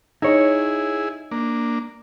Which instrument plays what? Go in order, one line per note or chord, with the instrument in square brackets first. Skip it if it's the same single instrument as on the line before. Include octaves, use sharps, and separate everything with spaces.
[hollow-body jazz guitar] D#4 C#5 [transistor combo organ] E4 G#4
[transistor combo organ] A#3 D4